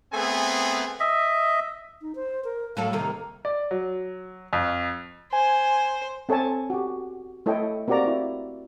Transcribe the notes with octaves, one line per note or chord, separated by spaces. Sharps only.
A3 B3 C4 G#4 G#5
D#5 E5
D#4
C5
A#4
A2 F#3 A4 F5
C3 D#3 A#3 A4
D5
F#3
F2
C5 G#5
C4 A4 C#5 G#5 A5
F#4 G4
A3 E4 A4 C#5 D#5 G5
A#3 C4 F#4 G4 D5 A#5
E4